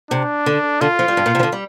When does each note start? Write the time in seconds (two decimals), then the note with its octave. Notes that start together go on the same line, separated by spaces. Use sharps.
0.11 C3 D4
0.46 D3
0.81 D3 F4
0.99 F3
1.08 G3
1.17 G2
1.26 A#2
1.35 C3
1.40 F3
1.43 D3
1.52 G3